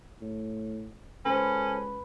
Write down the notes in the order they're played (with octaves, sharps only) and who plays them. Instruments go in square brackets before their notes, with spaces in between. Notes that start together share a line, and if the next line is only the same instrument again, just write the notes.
[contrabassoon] A2
[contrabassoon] C#2 [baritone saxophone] C#4 [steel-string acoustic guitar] A4 C5 [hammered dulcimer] B4